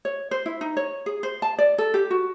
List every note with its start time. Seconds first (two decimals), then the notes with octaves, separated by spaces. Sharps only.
0.05 C#5
0.31 C5
0.46 E4
0.61 D#4
0.77 C#5
1.06 G#4
1.23 C5
1.42 A5
1.58 D5
1.78 A4
1.94 G4
2.11 F#4